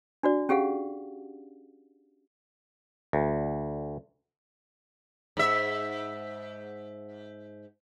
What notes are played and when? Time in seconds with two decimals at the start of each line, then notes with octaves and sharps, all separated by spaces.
0.23 D4 F#4 D5
0.49 C#4 G4 G#4 F5 F#5
3.13 D2
5.37 G#2 E5